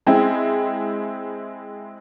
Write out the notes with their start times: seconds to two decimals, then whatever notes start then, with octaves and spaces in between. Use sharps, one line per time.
0.07 G#3 C4 E4